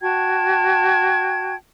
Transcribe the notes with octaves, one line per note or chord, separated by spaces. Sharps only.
F#4 G5 A5 G#6